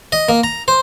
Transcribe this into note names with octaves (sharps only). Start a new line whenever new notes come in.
D#5
A#3
A#5
C5